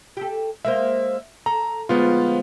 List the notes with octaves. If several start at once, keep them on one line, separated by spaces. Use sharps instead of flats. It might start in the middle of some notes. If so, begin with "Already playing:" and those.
G4 A4
G#3 A#3 C5 E5
A4 A#5
D2 F3 G#3 B3 C#4 F4